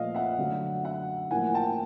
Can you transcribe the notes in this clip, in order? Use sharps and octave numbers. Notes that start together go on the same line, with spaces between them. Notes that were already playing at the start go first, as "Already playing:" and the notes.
Already playing: A#2 F3 A3 D#5 F5
E5 F#5
D3 F#3 A3
E5 F#5
A2 F3 A#3 F#5 G#5
G5 A5